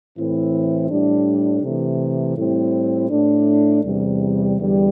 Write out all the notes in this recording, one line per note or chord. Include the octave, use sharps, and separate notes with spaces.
A2 E3 C4 E4
A2 G3 D4
C3 E3 A3
A2 G3 C4 E4
A2 A3 D4
E2 C3 G3
E2 D3 G3